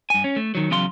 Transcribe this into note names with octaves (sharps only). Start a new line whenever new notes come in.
G2 G#5
C#4
A3
D#3 F#3
E2 C#3 F#3 F5 C6